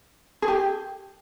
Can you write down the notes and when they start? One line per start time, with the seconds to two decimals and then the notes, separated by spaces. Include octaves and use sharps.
0.42 G#4
0.48 G4